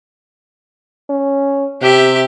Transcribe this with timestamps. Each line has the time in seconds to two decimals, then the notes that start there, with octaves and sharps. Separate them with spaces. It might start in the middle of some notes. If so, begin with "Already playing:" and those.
1.09 C#4
1.82 C3 G4 E5